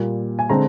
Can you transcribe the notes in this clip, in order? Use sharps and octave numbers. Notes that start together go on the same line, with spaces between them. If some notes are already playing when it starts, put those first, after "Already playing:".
Already playing: A#2 G3 A#3
G#5
D3 G#3 C4 A#5